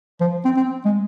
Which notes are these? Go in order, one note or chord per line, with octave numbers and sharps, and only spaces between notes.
F3
C4
C4
G#3